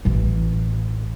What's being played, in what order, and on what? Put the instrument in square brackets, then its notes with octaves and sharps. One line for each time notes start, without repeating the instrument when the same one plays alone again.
[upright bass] A1 E3